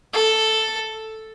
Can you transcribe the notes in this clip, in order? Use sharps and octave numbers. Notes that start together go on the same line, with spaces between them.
A4